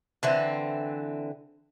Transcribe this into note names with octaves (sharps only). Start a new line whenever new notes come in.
D3 E3 C4